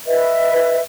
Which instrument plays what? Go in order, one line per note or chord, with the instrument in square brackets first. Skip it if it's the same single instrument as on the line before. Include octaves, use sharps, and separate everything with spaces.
[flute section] B4 D#5 E5